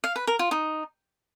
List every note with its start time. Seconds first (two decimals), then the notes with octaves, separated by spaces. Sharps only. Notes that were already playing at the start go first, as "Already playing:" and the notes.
0.04 F5
0.16 B4
0.27 A#4
0.39 F4
0.51 D#4